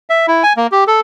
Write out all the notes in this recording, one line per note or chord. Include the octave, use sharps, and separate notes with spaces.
E5
E4
G#5
A#3
G4
A4